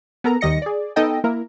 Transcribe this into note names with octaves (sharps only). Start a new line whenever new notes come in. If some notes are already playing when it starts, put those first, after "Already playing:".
B3 A4 A#4 A#5
D#2 D#3 G3 D#5 A#6 C#7
G#4 D5
B3 D#4 A4 D#5 G5
A#3 E4 A#4